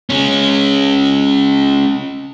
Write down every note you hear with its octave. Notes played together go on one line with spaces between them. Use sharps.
G#3 C#4